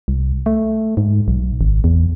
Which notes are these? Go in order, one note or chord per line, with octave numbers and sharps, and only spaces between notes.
C2
A3
G#2
B1
G#1
E2